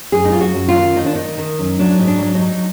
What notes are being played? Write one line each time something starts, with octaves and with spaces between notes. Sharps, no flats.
F#2 G#4
D#4
F#3 F4
F#4
F#2
F4
D#3
D#3 D#4
D4
D#3 D#4
D#3
F#2
F#3 D4
G#2 D#4
D4
F#3
D#4
F#3